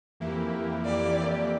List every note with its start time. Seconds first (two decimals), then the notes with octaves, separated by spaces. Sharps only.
0.20 F2 E3 A#3 E4 G4
0.84 F2 E3 A#3 E4 G4 D5